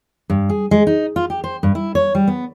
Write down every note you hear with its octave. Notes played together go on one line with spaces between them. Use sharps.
G2
G#4
G#3
D#4
F4
G4
C5
G2
E4
C#5
G3
B3